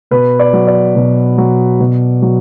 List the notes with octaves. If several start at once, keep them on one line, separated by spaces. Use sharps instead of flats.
B2 B4
D5
F#3
D5
B2
F#3
B2
F#3